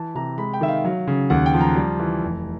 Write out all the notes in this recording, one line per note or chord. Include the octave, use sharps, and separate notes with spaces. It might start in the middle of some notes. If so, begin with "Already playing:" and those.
Already playing: E3 A5
C3 A#5
G#3 B5
G5
D#3 E5
F5
F#3
C#3
D#2 F#5
G5
F3
A#5
G3
E3
F1